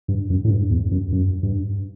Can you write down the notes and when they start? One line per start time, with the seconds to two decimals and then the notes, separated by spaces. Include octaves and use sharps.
0.08 G2
0.30 F#2
0.44 A2
0.50 G2
0.71 E2
0.91 F#2
1.12 F#2
1.43 G2